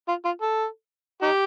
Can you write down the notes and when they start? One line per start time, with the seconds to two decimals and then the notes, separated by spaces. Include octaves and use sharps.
0.08 F4
0.25 F4
0.41 A4
1.22 D#4 G4